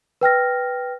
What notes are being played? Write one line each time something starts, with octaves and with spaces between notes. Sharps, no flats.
B4 G5 F6 A#6